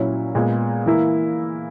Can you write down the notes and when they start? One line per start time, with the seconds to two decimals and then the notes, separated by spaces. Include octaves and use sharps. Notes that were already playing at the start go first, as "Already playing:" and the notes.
Already playing: A#2 F#3 C#4 E4
0.35 A#2 G#3 B3
0.86 E3 A#3 E4